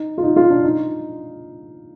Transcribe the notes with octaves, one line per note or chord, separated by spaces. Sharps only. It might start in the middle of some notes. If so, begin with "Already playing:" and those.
Already playing: D#4
F4
D#4
F4
D4
D#4